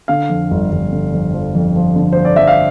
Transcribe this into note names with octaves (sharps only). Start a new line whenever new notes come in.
D3 F5
F2
G1
G1
D3
F2
F3
F2
F3
D3
F3 C5
D5
F3 E5
F5